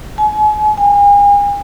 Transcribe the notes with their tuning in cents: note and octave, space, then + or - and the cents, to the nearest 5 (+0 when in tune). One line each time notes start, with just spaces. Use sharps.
G#5 +40
G#5 -40